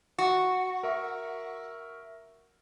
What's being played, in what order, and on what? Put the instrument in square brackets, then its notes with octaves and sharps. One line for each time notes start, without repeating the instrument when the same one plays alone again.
[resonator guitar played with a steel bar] F#4
[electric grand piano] A#4 E5 C#6